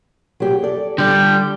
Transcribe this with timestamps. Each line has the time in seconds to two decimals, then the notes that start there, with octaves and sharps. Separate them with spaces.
0.40 F#3 G4 G#4
0.62 A4 D5
0.98 D3 G3 G5